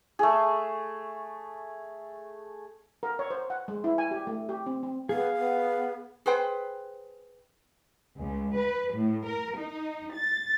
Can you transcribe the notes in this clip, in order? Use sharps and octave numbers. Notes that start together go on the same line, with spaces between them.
A3 G#4
A#4
C#5
C5
F#5
G#3
E4
G#5
G4
A3
G4
C4
C4
B3 G#4 F5
B3
G#4 B4 C5 G5
C#2
B4
A2
A#4
D#4
A6